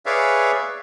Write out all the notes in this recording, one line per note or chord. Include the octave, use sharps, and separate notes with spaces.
G#4 B4 C#5 D5 E5 F5